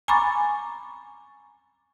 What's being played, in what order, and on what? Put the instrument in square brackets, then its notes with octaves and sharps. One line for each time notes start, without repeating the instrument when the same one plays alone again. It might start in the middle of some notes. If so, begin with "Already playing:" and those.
[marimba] G#5 A#5 B5 C#6 D6 A6